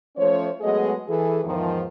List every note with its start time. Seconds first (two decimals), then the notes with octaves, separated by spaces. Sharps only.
0.16 F3 A3 C#4 C5 C#5
0.61 F#3 G#3 A3 B3 G#4 D#5
1.08 E3 G#4 A4
1.45 E2 G#2 D#3 F3